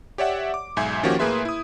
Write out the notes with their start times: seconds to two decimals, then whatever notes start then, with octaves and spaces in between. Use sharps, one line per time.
0.18 G4 C#5 D5 E5 F#5
0.54 D6
0.76 B1 G#2 E5 G#5 G6 G#6
1.03 D#3 F3 A#3 C#4 F#4 G4
1.19 A2 A#3 G#4 B4 E5 C6
1.45 E4 D#6